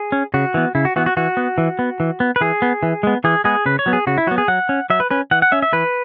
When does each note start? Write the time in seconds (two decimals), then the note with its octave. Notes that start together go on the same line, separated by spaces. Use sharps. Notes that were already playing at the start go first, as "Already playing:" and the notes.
Already playing: G#4
0.12 C#4
0.34 C#3 F#4
0.54 E3 B3
0.75 C#3 E4
0.85 F#4
0.96 E3 B3 F#4
1.06 F#4
1.17 E3 F#4
1.37 B3
1.58 E3
1.79 B3
2.00 E3
2.20 B3
2.36 B4
2.41 E3 G#4
2.62 B3
2.83 E3
3.03 G#3 B3
3.24 E3 G#4
3.44 G#3 B3 G#4
3.66 C#3 B4
3.79 C#5
3.86 F#3 B3
3.93 G#4
4.07 C#3 F#4
4.18 E4
4.27 F#3 B3 F#4
4.38 G#4
4.48 F#3 F#5
4.69 C#4
4.90 F#3 E5
5.00 B4
5.11 C#4 B4
5.31 E3 F#5
5.42 F#5
5.52 C#4 E5
5.62 E5
5.73 E3 B4